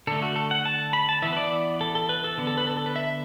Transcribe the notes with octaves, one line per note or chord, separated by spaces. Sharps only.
D3 A3 A4
F#4
A4
F#5
A5
B5
A5
E3 B3 E5
B4
D5
A4
A4
B4
A4
D3 B3
A4
B4
A4
A4
B4
E5